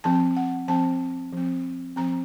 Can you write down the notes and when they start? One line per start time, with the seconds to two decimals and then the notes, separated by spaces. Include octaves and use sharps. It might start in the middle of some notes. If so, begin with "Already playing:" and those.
0.04 F3 C4 A5
0.37 F#5
0.68 F3 C4 A5
1.32 F3 C4
1.96 F3 C4 A#5